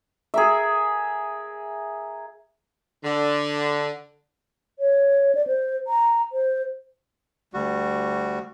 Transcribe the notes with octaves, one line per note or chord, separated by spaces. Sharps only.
G#4 A#4 E5
D3
C#5
D5
C5
A#5
C5
D2 G3 F#4